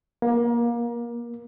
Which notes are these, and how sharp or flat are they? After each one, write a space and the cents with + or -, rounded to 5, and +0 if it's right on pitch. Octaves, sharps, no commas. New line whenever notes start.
A#3 +25